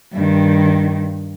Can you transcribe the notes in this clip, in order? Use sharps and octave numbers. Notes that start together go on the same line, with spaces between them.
G2 D#3